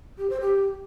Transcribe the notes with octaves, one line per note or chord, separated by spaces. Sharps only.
G4
C5
G4